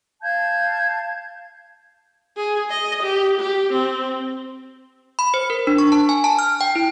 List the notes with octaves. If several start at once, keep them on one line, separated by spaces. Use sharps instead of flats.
F5 A5 G6 G#6
G#4
D#5
G4
G4
C4
B5
C5
A#4
D4
C#6
A5
G#5
A5
F6
G5
E4